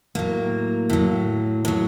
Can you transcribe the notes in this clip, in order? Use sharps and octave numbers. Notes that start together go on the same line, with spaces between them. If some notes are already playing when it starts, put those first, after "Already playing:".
A2 F#3 A#3
A2 F#3
A2 F#3